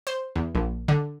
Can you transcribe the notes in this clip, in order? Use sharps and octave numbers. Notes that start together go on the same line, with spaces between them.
C5
E2
A#1
D3